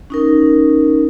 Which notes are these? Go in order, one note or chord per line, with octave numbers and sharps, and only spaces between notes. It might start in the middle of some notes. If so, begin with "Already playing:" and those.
C#4 D#4 A#4